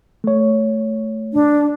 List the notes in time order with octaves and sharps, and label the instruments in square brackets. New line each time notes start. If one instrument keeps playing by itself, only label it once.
[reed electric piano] A3 C#5
[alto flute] D4